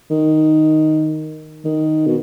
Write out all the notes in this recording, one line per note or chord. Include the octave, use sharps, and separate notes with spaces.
D#3
D#3
B2